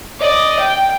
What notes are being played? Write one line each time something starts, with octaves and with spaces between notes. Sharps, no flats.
D5 D#5
G5